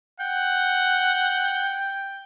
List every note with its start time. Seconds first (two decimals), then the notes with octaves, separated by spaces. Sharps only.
0.20 F#5 G5